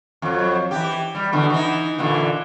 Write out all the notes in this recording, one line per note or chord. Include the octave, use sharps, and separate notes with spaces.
F2 F#3
E3 G4
G3
B2 D3 E3
E3 D#4
A#2 D3 E3